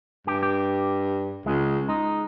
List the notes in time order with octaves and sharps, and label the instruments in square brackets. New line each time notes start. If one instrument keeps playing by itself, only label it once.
[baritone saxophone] G2 [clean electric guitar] G4
[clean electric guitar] G4
[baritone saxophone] C#2 [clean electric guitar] G#3
[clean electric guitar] G#3 [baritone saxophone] D#4